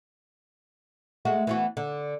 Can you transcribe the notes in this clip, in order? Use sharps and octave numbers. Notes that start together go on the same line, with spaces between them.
G#3 A3 F#4
E3 B3 F#4
D3